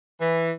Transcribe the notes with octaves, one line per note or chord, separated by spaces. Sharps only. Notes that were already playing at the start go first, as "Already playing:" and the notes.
E3